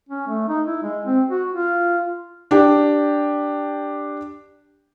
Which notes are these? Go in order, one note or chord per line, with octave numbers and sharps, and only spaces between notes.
C#4
A3
D#4
E4
G#3
C4
F#4
F4
D4 G4